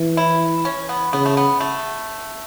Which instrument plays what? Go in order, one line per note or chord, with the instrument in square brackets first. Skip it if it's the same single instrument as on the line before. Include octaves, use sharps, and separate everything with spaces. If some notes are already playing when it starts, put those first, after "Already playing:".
Already playing: [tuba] E3
[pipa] E4
C#4
B3
[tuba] C#3 [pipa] B3
[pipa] A3
B3
A3